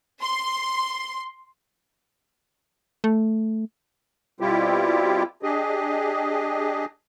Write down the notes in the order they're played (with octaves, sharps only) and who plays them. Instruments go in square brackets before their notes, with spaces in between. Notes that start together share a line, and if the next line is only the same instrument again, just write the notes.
[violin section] C6
[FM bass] A3
[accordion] B2 G3 C4 E4 F4 G4
D4 G4 G#4 D#5